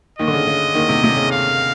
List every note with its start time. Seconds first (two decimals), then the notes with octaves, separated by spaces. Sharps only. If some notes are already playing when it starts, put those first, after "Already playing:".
0.19 D#2 D#3 D#5
0.28 D3
0.33 C#3
0.47 C#3
0.74 D#2 D#3
0.89 C3
1.04 C3
1.17 C#3
1.31 F5